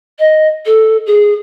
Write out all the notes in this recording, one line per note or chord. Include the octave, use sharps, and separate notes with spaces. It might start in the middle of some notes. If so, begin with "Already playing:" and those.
D#5
A4
G#4